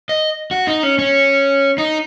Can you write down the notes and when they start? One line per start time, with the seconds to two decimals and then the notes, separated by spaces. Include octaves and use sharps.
0.09 D#5
0.51 F#4
0.67 D#4
0.83 C#4
0.99 C#4
1.78 D#4